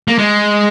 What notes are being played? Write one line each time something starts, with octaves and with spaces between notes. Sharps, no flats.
A#3
G#3